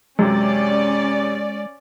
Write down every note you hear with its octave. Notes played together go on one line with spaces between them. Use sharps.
F#2 C3 G#3 C#4 D5